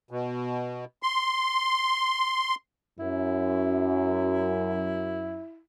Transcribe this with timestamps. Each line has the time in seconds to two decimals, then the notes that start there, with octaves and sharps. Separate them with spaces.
0.11 B2
1.03 C6
2.99 F#2 E4